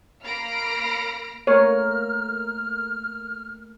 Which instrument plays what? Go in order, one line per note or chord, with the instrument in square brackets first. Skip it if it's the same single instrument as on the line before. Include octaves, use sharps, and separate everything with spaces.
[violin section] A#3 B5 F6 A#6 C7 D7
[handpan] A3 A#3 A#4 [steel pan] C#5 [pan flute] F6